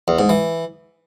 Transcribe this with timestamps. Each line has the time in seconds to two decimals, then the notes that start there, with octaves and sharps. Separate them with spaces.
0.08 E2
0.19 G#2
0.29 E3